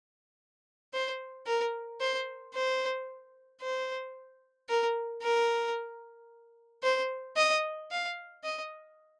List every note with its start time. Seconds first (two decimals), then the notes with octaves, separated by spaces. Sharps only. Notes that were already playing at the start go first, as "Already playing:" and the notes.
0.93 C5
1.46 A#4
2.01 C5
2.55 C5
3.62 C5
4.69 A#4
5.22 A#4
6.83 C5
7.37 D#5
7.91 F5
8.44 D#5